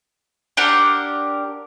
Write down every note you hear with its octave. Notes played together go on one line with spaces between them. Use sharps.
D4 G4 A#4 F#5